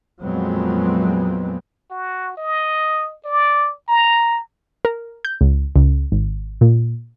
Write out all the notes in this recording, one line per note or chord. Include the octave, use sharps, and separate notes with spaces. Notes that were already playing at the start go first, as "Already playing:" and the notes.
F2 A#2 F#3 G#3 B3 C4
F#4
D#5
D5
A#5
A#4
G6
C#2
C#2
G#1
A#2